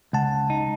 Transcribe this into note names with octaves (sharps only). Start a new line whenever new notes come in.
C#2 F#5 A5
D#4